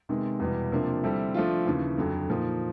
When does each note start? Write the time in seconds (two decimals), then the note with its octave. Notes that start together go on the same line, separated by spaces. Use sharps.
0.09 C3 D#3 G#3 B3
0.40 E2 B2 G3 B3
0.72 C3 F3 A#3 D4
1.03 D3 G3 C4 E4 A4
1.34 F3 A3 D4 F4
1.66 D#2 C#3 E3
1.98 F2 D3 F#3
2.29 A#2 F3 A#3 D#4